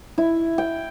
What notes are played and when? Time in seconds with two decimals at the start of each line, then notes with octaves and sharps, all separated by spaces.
0.18 E4
0.58 G5